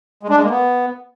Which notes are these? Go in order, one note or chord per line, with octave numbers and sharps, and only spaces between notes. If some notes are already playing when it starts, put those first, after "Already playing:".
G#3
D4
G#3
A#3
B3